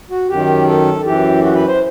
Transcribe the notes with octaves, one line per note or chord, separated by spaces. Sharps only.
F#4
F#2 D#3 G4
A4
F#2 E3 G4
F#4
B4
C5